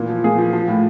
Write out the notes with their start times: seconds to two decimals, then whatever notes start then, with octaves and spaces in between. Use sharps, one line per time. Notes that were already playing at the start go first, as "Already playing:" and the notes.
Already playing: A#2 E3
0.09 F3
0.24 A#2 G#4
0.38 F3
0.53 F3
0.68 A2